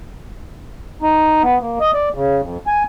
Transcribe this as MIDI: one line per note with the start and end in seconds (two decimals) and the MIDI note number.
1.02 1.43 63
1.43 1.59 59
1.61 1.79 58
1.80 1.91 75
1.94 2.09 74
2.14 2.41 49
2.42 2.58 41
2.67 2.83 80